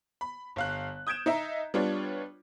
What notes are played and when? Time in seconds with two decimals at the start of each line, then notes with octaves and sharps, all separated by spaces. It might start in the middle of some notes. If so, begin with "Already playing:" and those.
0.21 B5
0.56 G1 F5 F#6
1.07 D#6 G6 G#6 D7 E7
1.26 D#4 D#5 E5 A#5
1.74 G3 B3 D4 F4 C#5